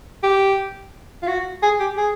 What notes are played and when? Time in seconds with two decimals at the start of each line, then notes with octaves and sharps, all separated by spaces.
0.23 G4
1.23 F4
1.27 F#4
1.63 G#4
1.80 G4
1.97 G#4